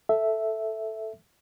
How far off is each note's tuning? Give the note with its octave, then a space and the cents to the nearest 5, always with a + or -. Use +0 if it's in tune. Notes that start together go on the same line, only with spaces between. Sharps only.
A4 +0 E5 +0